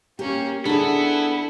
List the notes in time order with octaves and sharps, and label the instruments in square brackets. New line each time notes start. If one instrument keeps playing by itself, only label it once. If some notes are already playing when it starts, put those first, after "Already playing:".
[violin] A#3 C#4 [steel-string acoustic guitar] G4
[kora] D3 [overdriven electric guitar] B3 [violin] E4 [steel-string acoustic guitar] G#4 A4